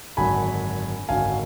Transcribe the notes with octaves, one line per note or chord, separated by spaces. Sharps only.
G#1 F#2 D3 F#3 G#5 B5
G#1 F#2 D3 F#3 F5 G#5